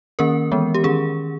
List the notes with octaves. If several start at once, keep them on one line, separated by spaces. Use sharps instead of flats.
D#3 A#3 C#4 A#4
E3 G#3 B3
G4
D#3 C#4 G#4